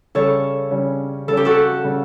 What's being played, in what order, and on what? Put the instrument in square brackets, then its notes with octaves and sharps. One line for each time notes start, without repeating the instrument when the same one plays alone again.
[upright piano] C#3 G3 C#4 [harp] A4 C#5
[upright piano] C#3 G3 C#4
[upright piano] C#3 G3 C#4 [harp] A4
[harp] G4
F#4 A4
[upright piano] C#3 G3 C#4